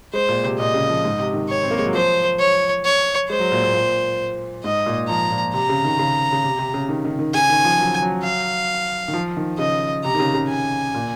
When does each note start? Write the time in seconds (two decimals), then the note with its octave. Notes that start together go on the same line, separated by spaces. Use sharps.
0.13 G#3 C5
0.28 A#2
0.44 C3
0.58 A#2 D#5
0.74 C#3
0.89 F3
1.05 G#2
1.19 C3
1.34 D#3
1.49 C#5
1.63 C4
1.71 A#3
1.79 G#3
1.86 F#3
1.93 F3 C5
2.39 C#5
2.85 C#5
3.29 G#3 C5
3.40 F#3
3.52 A#2
3.63 A#2
3.73 A#2
4.64 G#2 D#5
4.86 A#2
5.08 F3 A#5
5.31 A#2
5.54 C3 A#5
5.69 C#3
5.85 D#3
5.99 C#3
6.32 C#3
6.44 C3
6.59 C3
6.74 C#3
6.89 D#3
7.05 D#3
7.19 D#3
7.34 C#3 G#5
7.50 D#3
7.65 F3
7.79 F#3
8.02 F#3
8.23 F5
9.08 D#3
9.13 F3
9.37 D#3
9.58 C#3 D#5
10.04 C3 A#5
10.14 D#3
10.20 C#3
10.34 C#3
10.49 G#5
10.95 A#2